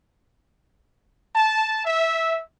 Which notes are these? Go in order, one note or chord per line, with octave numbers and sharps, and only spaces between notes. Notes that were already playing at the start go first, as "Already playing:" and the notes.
A5
E5